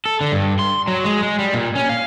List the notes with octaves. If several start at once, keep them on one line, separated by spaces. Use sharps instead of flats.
A4
D3
G2
C6
F#3
G#3
G#3
G3
A#2
C#4
F5